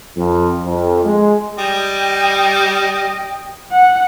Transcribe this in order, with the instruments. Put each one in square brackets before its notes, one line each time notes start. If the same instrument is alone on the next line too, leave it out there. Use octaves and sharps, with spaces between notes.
[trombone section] F2
F2
G#3
[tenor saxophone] G3 [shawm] D#5 [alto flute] G5
[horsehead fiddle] F#5